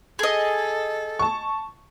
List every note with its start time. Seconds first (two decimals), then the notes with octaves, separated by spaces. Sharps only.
0.19 G#4 A4 D#5
1.19 A5 C#6